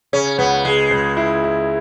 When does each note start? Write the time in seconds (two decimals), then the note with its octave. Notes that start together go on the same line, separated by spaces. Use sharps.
0.13 C#3 C#4
0.38 C#2 B3
0.64 C#3 G#3
0.91 C#2
1.17 E4
1.44 E4